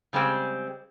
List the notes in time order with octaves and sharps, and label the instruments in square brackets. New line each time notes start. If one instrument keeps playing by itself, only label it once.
[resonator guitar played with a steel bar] C#3 G3 G#3 C4